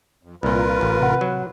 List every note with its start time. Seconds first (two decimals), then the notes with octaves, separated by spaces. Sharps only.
0.23 F2
0.43 C2 A#2 F4 A#4 B4
0.81 A1
1.00 C3 F#5
1.21 F#3